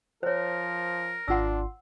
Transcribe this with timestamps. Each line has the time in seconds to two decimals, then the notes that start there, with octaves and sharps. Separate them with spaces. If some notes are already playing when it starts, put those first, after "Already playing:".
0.23 F3 A#4 C5 C#5
1.28 G#1 D4 F4 F#5 C6 E6